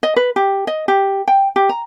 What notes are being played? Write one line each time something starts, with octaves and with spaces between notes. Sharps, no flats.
D#5
B4
G4
D#5
G4
G5
G4
A#5